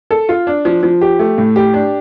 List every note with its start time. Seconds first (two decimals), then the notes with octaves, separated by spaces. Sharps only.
0.11 A4
0.29 F4
0.47 D4
0.65 F3
0.83 F3
1.01 G4
1.19 A3
1.38 A2
1.56 G4
1.74 D4